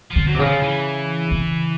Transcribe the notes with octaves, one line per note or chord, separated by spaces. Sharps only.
D3 F3
F#3
C3
C#3 E3
F3
E3
C#3